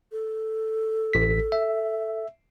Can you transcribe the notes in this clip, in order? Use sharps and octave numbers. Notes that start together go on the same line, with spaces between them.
A4
A1 B6
E5